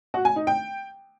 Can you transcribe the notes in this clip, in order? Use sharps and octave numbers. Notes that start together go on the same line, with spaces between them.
F#4
G#5
D#4
G5